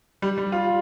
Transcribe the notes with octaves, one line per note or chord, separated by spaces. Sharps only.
G3
G3
F4